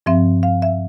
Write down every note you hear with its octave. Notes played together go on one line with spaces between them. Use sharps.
G2 F3 C4 E5
F5
E5